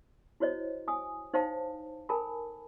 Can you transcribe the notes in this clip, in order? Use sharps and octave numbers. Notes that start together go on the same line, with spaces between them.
E4 F#4 C5 C#5 D#5
G#5 D#6
D#4 C5 C#5 F5 G5 A5
A4 A#4 G#5 A5 B5